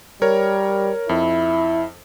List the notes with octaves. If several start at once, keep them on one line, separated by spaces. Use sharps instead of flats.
G3 A#4 C#5
F2 E4